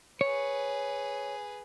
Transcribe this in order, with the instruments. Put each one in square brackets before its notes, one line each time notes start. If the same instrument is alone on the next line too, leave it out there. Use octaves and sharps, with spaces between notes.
[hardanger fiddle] G#4 B4 [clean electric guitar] C#5